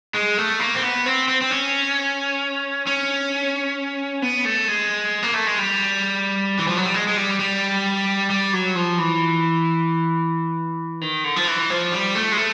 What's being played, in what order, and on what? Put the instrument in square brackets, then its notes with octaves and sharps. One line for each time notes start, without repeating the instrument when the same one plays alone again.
[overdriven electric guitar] G#3
A3
A#3
C4
B3
C4
C4
C4
C#4
C#4
B3
A3
G#3
A#3
A3
G#3
G3
E3
F3
F#3
G3
G#3
G#3
G3
G3
G3
F#3
F3
E3
D#3
D3
F3
E3
F3
G3
A3
G#3
A3